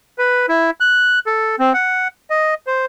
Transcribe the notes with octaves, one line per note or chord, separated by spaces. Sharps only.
B4
E4
F#6
A4
C4
F#5
D#5
C5